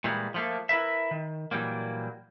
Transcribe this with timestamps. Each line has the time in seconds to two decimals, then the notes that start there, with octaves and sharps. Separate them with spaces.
0.04 A#2 E3 G3 G#3
0.34 F3 A3 A#3
0.69 E4 A#4 B4 E5
1.11 D#3
1.51 A#2 E3 F#3 G3 A#3